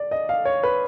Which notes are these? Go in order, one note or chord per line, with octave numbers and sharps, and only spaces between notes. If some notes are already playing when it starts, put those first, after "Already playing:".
Already playing: D5
D#5
F5
C#5
B4